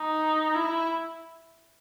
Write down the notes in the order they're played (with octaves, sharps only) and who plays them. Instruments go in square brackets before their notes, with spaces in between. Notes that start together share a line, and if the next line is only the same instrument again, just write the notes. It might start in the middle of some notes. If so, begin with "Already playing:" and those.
Already playing: [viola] D#4
E4